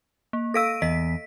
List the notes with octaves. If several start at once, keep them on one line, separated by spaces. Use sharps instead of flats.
A#3
A4 F5 E6 A#6 D7 D#7
E2 D#5 B6